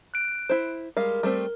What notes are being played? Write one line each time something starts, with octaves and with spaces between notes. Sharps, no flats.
F#6 D7
E4 C5
G3 G#3 A#4 F5
G3 A3 C4